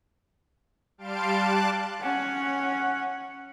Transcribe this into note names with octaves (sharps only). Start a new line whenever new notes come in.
G3 F5 A5 C6 D7
A5 D6 F#6
C#4 F#5